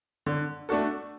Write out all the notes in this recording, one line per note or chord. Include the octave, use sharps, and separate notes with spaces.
D3
A3 D4 F#4 A4